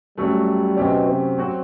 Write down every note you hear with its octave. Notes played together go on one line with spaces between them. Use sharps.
F#2 F#3 G3 A3
F#2 B2 F#3 C4 G4
C3
F#3 C4 F#4